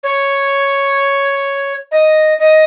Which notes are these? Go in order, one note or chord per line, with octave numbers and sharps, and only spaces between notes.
C#5
D#5
D#5